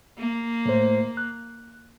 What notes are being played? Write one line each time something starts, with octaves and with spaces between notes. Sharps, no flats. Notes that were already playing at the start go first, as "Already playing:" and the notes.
A#3
A2 A3 C5
F#6